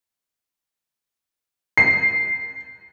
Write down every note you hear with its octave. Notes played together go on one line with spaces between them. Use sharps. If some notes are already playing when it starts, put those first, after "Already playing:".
C7